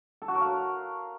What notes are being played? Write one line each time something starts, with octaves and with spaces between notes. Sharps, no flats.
A4
F#4
A#4
F5